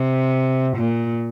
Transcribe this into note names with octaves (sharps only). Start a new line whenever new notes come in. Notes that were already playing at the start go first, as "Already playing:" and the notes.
Already playing: C3
A#2